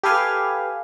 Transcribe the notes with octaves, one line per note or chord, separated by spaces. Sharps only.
G4 A4 B4 F5 G#5